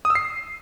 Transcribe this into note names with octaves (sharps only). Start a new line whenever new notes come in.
D#6
E6
C7